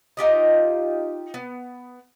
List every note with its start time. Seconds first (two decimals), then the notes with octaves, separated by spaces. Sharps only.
0.17 D#4 F4 G4 D#5
1.34 B3